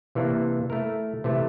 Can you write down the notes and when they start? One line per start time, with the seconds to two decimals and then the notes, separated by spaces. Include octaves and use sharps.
0.15 C3 E3 A#3 D4
0.70 A3 E4 A#4
1.24 C3 E3 A3 E4